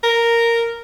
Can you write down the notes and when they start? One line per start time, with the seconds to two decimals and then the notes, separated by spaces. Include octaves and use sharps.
0.03 A#4